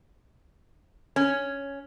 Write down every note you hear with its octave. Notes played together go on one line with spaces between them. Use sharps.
C#4